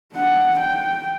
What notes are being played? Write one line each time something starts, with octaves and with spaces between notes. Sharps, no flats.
D4 F#5
G5